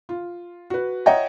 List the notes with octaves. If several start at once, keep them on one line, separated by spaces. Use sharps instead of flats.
F4
F#4 B4
C#5 D#5 E5 F#5 G5 A#5